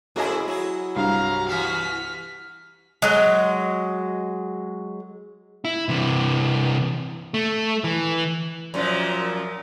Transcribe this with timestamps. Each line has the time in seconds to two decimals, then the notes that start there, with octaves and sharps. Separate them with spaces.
0.16 C#3 A3 E4 F#4 C5 D#5 G#5
0.48 F#3 E4 G#4
0.96 C2 G2 F5 A#5
1.48 E3 F#4 F6 B6
3.02 F#3 G#3
5.65 E4
5.89 C3 E3
7.34 A3
7.84 E3
8.74 F#2 A#2 F3